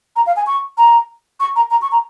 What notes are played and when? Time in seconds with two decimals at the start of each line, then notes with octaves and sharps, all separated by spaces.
0.16 A#5
0.26 F5
0.36 G#5
0.47 C#6
0.78 A#5
1.40 C#6
1.56 A#5
1.70 A#5
1.82 C#6
1.91 A#5